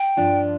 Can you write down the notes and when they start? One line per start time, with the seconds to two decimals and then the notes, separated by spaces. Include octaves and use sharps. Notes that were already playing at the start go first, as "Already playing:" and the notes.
Already playing: G5
0.17 G2 F3 D4 F4